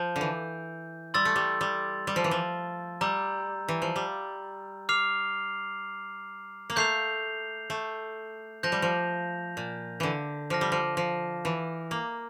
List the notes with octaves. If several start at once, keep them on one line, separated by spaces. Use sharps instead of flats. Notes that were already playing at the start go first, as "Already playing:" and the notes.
Already playing: F3 G6
D3
E3
G3 C6 E6 A6
A3
G3
G3
G3
F3
E3
F3
G3 A#5 E6 G6
E3
F3
G3
D6 F6 C7 F7
A#3
A3 G6 C7 F7
A3
F3 G6 A#6 F7
G3
F3
A#2
D3 E3
F3 D6 F6 A#6
G3
F3
F3
E3
A#3